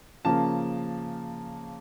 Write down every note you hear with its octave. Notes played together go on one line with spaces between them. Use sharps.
C#3 F3 A#3 A5